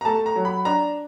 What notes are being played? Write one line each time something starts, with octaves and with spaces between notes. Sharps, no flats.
A#5
A3 A5
A#5
F#3
B5
D4 A#5